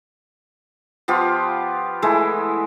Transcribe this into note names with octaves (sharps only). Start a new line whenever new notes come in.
F3 B3 F4 G4
E3 G#3 A3 E4